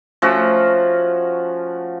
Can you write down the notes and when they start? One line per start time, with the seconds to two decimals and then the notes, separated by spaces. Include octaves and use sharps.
0.22 F3 A3 C#4 F#4